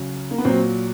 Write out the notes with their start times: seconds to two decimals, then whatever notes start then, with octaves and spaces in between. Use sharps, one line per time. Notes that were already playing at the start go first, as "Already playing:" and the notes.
Already playing: C#3 F#3
0.31 A#3
0.38 B3
0.45 A#2 F#3 C4